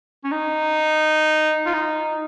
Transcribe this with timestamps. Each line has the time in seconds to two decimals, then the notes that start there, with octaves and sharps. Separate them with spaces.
0.24 C#4
0.31 D#4
1.66 F4
1.73 D#4